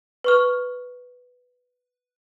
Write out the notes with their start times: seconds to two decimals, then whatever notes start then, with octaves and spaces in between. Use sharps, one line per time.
0.24 B4 C#6 F6